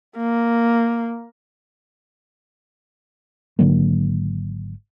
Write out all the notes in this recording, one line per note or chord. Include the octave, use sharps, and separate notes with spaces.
A#3
G#1 D3 F#3 A#3